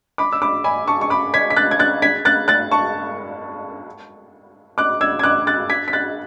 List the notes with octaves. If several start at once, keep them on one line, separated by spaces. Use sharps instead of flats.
B5 D6
E6
B5 D6
G#5 B5
A5 C#6
C#6
B5 D6
G#6 B6
B6
F#6 A6
G#6
F#6 A6
G#6 B6
F#6 A6
F#6 A6
A5 C#6
D6 F#6
E6 G#6
G#6
D6 F#6
F#6 A6
G#6 B6
B6
F#6 A6